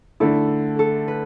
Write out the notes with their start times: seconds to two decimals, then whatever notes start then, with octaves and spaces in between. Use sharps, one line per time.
0.20 D3 A3 E4 A4
0.79 A4
1.08 B4